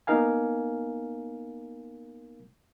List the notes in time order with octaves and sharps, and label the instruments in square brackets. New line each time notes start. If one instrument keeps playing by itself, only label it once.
[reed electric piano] A#3 B3 D#4 A#4 F5 G#5